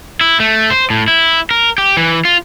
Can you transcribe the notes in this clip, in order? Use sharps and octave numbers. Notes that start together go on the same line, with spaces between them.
E4
A3
C5
A2
E4
A#4
G4
E3
F4